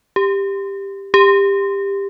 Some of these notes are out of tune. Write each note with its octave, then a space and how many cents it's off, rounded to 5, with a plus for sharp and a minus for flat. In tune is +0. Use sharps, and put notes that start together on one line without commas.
G4 +10
G4 +20